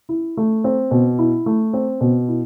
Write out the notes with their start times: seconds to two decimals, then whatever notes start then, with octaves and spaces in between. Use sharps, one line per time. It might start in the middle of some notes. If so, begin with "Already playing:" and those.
0.09 E4
0.37 A3
0.64 C4
0.91 B2
1.19 E4
1.46 A3
1.73 C4
2.01 B2
2.28 E4